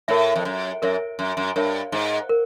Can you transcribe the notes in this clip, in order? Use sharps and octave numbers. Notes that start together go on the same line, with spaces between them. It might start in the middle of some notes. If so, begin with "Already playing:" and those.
A2 A#4 C#5 E5
F2
F#2
F#2 A#4 C#5 E5
F#2
F#2
G2 A#4 C#5 E5
G#2
A#4